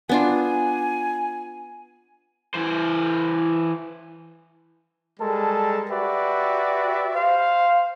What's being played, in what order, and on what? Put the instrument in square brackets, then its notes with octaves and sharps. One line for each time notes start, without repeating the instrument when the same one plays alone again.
[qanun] B3 D4 F4 [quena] G#5
[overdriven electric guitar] E3 C5
[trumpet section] G3 G#3 A4 A#4 A5
F#4 G4 B4 D5 E5
C5 F5